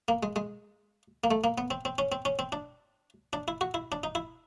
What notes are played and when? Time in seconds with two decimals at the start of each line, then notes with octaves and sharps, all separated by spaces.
0.08 A#3
0.23 G#3
0.36 G#3
1.24 A#3
1.31 A3
1.44 A#3
1.58 B3
1.71 C4
1.85 C4
1.98 C#4
2.12 C4
2.25 C#4
2.39 C4
2.52 D4
3.33 D4
3.48 E4
3.61 F#4
3.74 E4
3.92 D4
4.03 D#4
4.15 E4